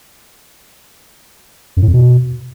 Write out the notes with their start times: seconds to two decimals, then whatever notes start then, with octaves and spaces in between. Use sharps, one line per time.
1.77 F#2
1.82 A2
1.88 F2
1.94 B2